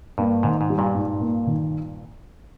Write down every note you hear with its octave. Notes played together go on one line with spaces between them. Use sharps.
G2 A#3
G#2 D#3
G#2
G3
G2 A#2
G#2
A#3
D#3